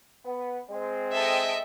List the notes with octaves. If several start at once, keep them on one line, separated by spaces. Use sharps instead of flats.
B3
G#3 C4
A4 D#5 E5 G5